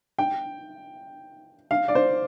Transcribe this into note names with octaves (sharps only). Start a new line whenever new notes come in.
G5
F5
D5
C5